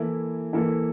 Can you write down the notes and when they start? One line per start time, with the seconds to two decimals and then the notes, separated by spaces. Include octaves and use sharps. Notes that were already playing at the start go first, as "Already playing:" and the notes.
Already playing: E3 A#3 E4 A4
0.53 E3 A#3 E4 A4